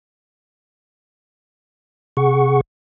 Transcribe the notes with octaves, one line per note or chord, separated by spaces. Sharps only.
C3 G#4 F#5 C#6